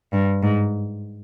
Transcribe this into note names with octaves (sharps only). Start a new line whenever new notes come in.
G2
G#2